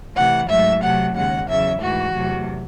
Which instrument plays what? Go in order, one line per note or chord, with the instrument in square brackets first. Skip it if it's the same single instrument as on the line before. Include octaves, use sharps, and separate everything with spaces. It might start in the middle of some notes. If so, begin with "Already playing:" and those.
[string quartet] C3 E3 A3 F#5
G#2 F#3 A3 E5
C3 F#3 A3 F#5
D#2 C#3 G#3 F#5
E2 C#3 F#3 E5
G#2 E3 A3 F#4
E2 C3 F#3 A3